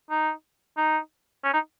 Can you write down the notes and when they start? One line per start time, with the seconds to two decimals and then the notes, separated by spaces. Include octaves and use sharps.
0.10 D#4
0.77 D#4
1.44 C#4
1.54 D#4